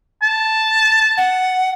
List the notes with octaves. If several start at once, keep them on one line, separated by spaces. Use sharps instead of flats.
A5
F#5